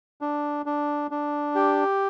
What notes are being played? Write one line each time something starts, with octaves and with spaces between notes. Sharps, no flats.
D4
D4
D4
G4